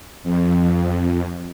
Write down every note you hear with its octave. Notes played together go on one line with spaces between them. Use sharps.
F2